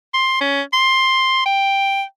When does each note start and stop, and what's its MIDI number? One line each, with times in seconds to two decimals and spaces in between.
0.14 0.37 84
0.41 0.61 61
0.73 1.41 84
1.46 2.02 79